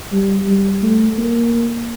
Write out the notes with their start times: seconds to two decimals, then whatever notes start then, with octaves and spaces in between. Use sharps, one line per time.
0.12 G3
0.48 G3
0.83 A3
1.18 A#3